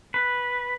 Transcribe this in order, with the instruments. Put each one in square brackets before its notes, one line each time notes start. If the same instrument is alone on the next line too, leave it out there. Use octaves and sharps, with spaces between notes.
[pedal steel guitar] B4